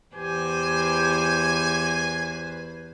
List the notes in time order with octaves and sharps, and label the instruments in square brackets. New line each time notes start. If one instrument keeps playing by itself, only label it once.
[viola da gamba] E2 B4 C5 [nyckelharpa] G4 [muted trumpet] G#5